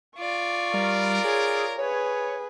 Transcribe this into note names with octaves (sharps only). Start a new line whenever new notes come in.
F4 D5 C#6
G3 A#4
G#4 C#5
G#4 B4 C#5